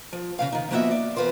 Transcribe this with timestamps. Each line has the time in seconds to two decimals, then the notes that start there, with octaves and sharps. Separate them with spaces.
0.13 F3
0.39 C#3 E3 F5
0.52 D#3 D#4
0.71 F3 A#3 B3 F#4 D#5 E5
0.91 D5
1.16 E2 G#2 F4 B4 C5